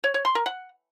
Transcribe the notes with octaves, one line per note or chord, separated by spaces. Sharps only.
C#5
C#5
C6
A#4
F#5